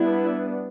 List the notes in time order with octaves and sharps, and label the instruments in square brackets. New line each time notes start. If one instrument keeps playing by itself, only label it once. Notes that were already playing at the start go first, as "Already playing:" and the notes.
Already playing: [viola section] G3 B3 D4 E4